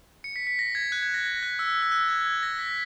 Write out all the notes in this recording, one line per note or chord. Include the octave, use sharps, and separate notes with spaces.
C#7
B6
B6
A#6
G#6
F#6
G#6
A#6
A#6
F#6
E6
E6
F#6
G#6
G#6
A#6
B6